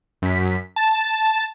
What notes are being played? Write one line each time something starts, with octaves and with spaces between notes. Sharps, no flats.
F#2 B6
A5